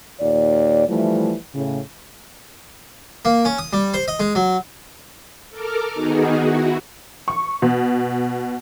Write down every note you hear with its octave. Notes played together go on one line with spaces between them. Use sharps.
D#2 A#2 D5
E3 F3 G3 A3
A2 C#3
A#3
C#4
D#6
G3
C5
D#5
G#3
F#3
A4 A#4 D6 F6
D#3 B3 D#4 F#4 G#4
E4 F#4
C#6
B2